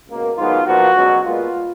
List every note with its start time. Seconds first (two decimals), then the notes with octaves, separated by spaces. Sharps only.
0.08 C#2 B2 A#3
0.37 G#2 D#3 F#3 B3 F4
0.66 A#2 F3 B3 F#4
0.96 C#2 B2 F#3
1.25 A#2 G#3 B3 F4